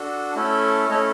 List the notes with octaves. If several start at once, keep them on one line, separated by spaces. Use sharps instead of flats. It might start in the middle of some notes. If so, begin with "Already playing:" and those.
Already playing: D4 F#4 A4
A3 C#4 E4 A4
A3 C#4 E4 A4 C#5 D#5